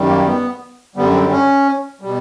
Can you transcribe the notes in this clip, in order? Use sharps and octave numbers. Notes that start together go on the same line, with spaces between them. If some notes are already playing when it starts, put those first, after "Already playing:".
Already playing: F#2 D#3 G3
A#3
B3
F#2 D3 G3 B3
C4
C#4
B2 G3